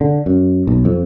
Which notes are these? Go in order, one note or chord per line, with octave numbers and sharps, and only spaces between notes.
D3
F#2
B1
F2